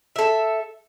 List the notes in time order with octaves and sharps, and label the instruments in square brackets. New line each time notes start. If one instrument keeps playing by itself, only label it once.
[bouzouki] A4 E5